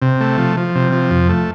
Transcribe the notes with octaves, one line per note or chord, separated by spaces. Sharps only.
C3
A3
F3
F3
C3
F3
F2
A3